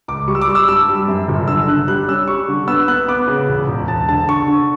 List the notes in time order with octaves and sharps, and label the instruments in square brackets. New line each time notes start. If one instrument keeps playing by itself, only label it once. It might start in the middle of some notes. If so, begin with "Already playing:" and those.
[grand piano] C#2 D6
G3 C#6
E6
D6
G3
E6
G2 E6
G3
F#2
G1
D3 E6
D3 F#6
G3 F#6
C#4 E6
G3 C#6
D3
B3 E6
B3 F#6
B3 D6
C#3
E1
E1
E1 A5
D3 A5
D3 C#6
D3